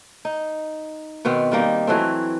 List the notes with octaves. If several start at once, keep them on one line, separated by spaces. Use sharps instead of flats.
D#4
B2 D#3 B3 C4
D#3 G3 A#3 D#4
E3 F#3 A3 C4